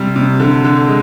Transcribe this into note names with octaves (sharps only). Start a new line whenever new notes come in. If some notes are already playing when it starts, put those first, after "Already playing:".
Already playing: C3 G3
C3
D3
D3
G#3